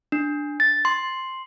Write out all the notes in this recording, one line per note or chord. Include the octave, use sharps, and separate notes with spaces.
D4
A6
C6